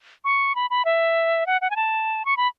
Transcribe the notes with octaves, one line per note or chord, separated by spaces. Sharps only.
C#6
B5
B5
E5
F#5
F#5
G#5
A5
C#6
B5